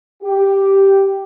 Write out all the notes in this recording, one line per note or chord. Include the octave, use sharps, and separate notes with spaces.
G4